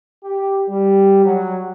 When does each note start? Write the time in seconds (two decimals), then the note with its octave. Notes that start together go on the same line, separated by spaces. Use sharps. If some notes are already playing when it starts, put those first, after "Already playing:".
0.24 G4
0.69 G3
1.24 F#3